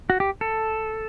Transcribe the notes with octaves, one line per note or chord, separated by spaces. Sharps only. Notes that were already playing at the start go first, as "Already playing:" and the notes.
F#4
G4
A4